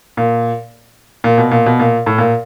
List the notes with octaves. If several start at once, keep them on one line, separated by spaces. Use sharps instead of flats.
A#2
A#2
B2
A#2
B2
A#2
A2
A#2